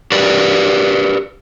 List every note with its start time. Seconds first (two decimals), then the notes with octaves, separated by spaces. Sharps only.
0.12 G4 A#4 B4 D5